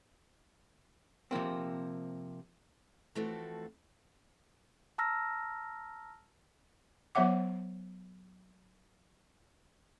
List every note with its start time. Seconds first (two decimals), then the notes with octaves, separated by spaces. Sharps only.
1.31 C3 F3 A#3 C4
3.15 E3 F3 A3 C4 F#4 A4
4.98 A5 A#5 E6 F6 A#6
7.15 F#3 B3 C#5 E5 F#5 D6